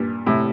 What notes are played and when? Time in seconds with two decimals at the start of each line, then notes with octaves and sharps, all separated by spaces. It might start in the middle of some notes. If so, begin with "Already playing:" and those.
Already playing: G2 A#2
0.26 A2 C3